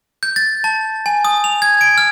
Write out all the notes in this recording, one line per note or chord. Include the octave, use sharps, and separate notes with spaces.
G6
A6
A5
G#5
D#6
F7
G#6
D7
F6